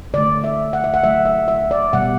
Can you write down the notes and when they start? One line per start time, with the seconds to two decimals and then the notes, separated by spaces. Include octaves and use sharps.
0.14 D3 A3 D5
0.44 E5
0.73 F#5
0.84 E5
0.94 F#5
1.03 D3 F#3 A3 E5
1.25 E5
1.48 E5
1.71 D5
1.93 B2 G3 F#5